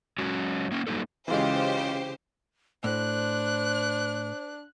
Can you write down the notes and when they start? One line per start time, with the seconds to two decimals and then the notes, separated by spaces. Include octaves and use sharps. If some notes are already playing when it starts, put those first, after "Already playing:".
0.19 F#3 G#3 C#4 F#4
0.72 A#3 C#4
0.87 F#3 G3 A#3 D#4 A4
1.28 C#3 E3 G#3 F4 G4 C5 D#5
2.84 A2 D4 C5 F#6